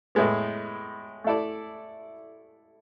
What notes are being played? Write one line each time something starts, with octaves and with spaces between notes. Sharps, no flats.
A2 G#3 B3
A3 E4 A4 D5